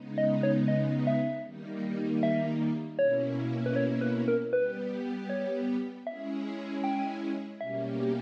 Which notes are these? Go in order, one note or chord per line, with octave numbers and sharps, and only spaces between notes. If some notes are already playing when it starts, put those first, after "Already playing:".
Already playing: C#3 G#3 B3 D#4
D#5
C#5
D#5
E5
D#3 G3 A#3 D#4
E5
B2 A#3 C#4 E4 C#5
B4
C#5
B4
A#4
G3 B3 G4 B4
C#5
G#3 C#4 E4 G#4 E5
G5
B2 G3 A#3 C#4 G4 E5